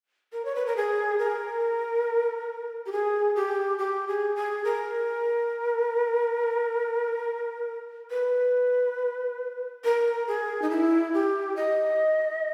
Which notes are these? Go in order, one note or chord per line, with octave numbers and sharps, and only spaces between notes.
A#4
C#5
B4
A#4
G#4
A#4
G4
G#4
G4
G4
G#4
G#4
A#4
B4
A#4
G#4
D#4
E4
G4
D#5